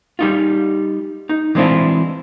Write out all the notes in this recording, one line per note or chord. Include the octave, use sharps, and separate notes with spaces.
G3 D#4 F4
D#4
E3 G#3 C4 D4 E4 F4